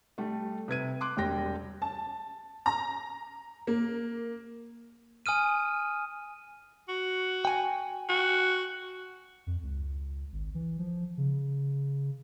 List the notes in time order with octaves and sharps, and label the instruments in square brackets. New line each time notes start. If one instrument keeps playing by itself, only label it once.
[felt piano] G3 A3
C3 B4 G#6 D#7
C6 D6 F#6
E1 G3 G4 G5 A#6
[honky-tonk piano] A5
A#5
A#3
[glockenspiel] G#5 D#6 F6 D#7
[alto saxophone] F#4
[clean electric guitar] G5 G#5
[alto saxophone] F#4
[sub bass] F2
C#2
G#1
E3
F3
C#3